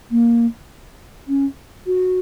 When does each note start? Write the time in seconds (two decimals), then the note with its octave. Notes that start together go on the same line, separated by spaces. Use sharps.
0.11 A#3
1.28 C#4
1.87 F#4